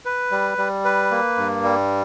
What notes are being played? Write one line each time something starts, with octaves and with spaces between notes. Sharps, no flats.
B4
G3
G3
B4
A#3
G2
G3